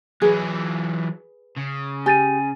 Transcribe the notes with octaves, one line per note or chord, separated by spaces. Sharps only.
E3 F#3 G#4 B4
C#3
G4 G#5 A6 D#7